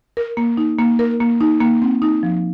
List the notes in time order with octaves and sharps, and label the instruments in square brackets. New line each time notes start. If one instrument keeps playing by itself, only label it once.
[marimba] A#4
A#3
D#4
A#3
A#4
A#3
D#4
A#3
C4
D#4
F3